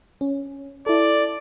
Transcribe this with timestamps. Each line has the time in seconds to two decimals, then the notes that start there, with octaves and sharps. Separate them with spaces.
0.21 C#4
0.86 E4 A4 D5